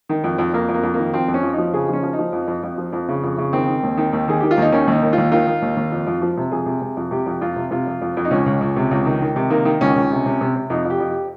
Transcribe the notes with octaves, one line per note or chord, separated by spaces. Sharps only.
D#3
F2
F2
F2 A#3
F2
A#3
F2
A#3
D#3
F3 C4
F2
C#4
F2
F3 D#4
C#3 G#4
F3 C#4
F3
D#4
F3
F2
F2
F2
F3
F2
C#3
F2
C#3
D#3 C4
D#3
D#2
D#3
D#2
D#3 G#4
D#3 G4
F4
D#2 D#4
D#3 C#4
D#2 D#4
D#3
D#2 F4
D#3 F4
D#3
D#2
D#2
F2
F2
F3
C3
F2 G#4
C3
C3
F2
C3 G4
F2
F2 F4
C3
C3 F4
F2
F2
F2
D#4
C#2 C#4
C#2
C#2
C3
C#2
D#3
D#3
C3
D#3 A#3
D#3
C#2 C#4
C#2
C3
C3
C3
C3
F2 D#4
F2
G4
F2
G4